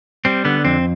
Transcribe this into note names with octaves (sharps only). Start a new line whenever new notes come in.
G3 C4
D3 B3
F2 C4